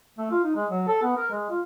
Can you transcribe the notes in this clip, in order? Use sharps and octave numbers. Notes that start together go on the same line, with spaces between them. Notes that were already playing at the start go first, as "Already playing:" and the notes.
A3
F4
D#4
G#3
F#3
A4
B3
A#4
G#3
F4